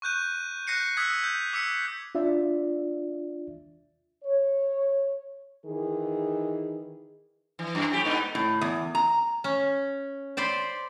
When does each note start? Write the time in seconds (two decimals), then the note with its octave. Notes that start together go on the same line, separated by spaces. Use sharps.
0.02 C#6 F#6 G6 D#7
0.67 F#6 G6 A#6 C7 C#7 D#7
0.97 D#6 E6 F#6 G#6 B6
1.24 G6
1.53 D6 E6 B6 C#7
2.15 D4 F4 D5 E5
4.24 C#5
5.66 D#3 E3 G#4
7.59 E3
7.75 F#2
7.90 A2 A3 G4
8.05 G#2 B3 D#4
8.35 A2
8.61 E2
8.95 A#5
9.44 C#4
10.37 C5 D5 B5 C6